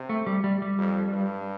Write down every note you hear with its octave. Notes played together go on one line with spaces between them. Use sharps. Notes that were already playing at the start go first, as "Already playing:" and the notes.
Already playing: C3
A3
G3
G3
G3
F2
G2